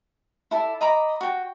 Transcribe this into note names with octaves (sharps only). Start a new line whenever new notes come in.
E4 A4 D5
D#5 A#5 B5 D6
F#4 G5